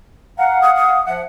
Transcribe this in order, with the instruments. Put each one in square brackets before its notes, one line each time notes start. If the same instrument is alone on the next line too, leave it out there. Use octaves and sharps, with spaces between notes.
[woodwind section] F5 F#5 [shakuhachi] A#5
[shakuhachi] D#6
D#6
[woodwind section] F3 F#5 [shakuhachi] E5